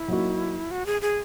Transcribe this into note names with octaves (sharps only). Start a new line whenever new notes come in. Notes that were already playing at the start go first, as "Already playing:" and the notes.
Already playing: E4
F#3 A#3 D#4 F#4
F#4
G#4
G#4